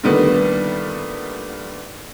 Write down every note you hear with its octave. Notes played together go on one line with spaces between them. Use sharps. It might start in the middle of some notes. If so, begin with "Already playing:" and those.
A#2 D3 D#3 G3 A3 B3